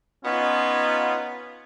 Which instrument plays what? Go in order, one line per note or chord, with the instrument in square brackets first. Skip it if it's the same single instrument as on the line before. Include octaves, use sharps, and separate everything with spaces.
[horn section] B3 D#4 F4 [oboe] C#4